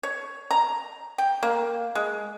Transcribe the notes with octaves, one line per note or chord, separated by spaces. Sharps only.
C#5
A#5
G5
A#3
G#3